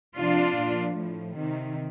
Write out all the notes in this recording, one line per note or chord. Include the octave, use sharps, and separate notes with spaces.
C3 F3 D4 F4
A#2 F3
A2 F3
C3 D#3